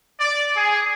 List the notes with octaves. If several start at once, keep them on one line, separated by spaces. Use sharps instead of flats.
D5
G#4